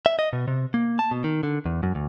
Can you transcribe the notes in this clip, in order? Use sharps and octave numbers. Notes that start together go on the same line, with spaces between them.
E5
D#5
B2
C3
A#3
A5
B2
D#3
D3
E2
F#2
D2